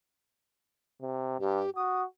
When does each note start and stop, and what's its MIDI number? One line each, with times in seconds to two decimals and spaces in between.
1.02 1.36 48
1.40 1.63 43
1.40 1.70 67
1.76 2.04 66
1.76 2.02 87